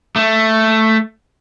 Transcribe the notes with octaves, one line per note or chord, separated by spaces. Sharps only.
A3